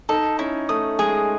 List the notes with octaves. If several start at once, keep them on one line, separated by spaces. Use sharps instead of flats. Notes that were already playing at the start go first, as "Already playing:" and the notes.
D#4 A4
C#4 E4
A3 D#6
G#3 G#4